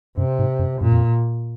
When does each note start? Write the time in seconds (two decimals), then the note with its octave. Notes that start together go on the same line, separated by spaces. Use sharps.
0.17 F#2 C3
0.39 G#2
0.59 F#2
0.81 F#2 A#2
0.92 F2